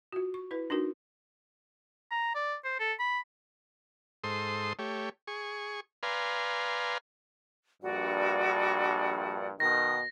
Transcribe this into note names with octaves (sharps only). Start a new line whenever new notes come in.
F4 F#4
C#6
E4 B4
D4 D#4 F4 F#4 A#4
A#5
D5
C5
A4
B5
G#2 A4 C5 C6 D#6
A3 G4 C#5
G#4 C#6
B4 D5 F5 G#5 A#5 C6
A#1 G2 F#4 D5 F#5
B2 D#3 D#6 A#6